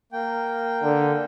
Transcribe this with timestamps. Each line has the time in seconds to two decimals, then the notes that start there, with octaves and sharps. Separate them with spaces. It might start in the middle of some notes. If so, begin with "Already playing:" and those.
0.12 A#3 G5
0.83 D3